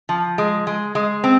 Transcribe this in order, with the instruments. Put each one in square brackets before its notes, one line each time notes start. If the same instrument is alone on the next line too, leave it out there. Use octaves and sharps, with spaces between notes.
[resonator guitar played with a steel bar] F3
G#3
G#3
G#3
C4